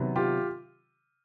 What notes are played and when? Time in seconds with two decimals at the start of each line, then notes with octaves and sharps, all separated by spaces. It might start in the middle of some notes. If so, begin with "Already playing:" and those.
Already playing: C3 D#3 F#3 B3
0.16 F4 G4